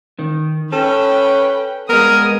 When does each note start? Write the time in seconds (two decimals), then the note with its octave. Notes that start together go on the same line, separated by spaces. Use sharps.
0.19 D#3
0.72 C#4 A4 B4 G5
1.89 G#3 B3 A#4 D#6